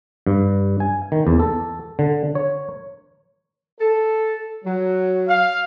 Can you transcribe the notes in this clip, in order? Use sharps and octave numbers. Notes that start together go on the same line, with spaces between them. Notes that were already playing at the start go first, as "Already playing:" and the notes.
G2
G#5
D#3
E2
A4
D3
C#5
A4
F#3
F5